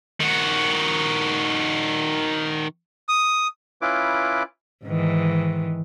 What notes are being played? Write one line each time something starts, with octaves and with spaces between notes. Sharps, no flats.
D#3 F#4
D#6
C#4 E4 F4 B4 D6
G#2 D#3 E3